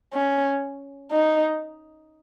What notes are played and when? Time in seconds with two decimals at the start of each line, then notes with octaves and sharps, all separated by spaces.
0.14 C#4
1.12 D#4